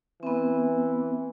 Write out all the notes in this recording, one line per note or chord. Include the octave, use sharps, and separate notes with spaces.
E3 B3 C4